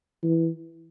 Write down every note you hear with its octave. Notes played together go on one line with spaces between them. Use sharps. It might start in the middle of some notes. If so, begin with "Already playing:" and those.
E3